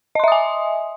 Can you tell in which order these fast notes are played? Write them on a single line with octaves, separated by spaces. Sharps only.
D#5 C6 E5 D#6 G#5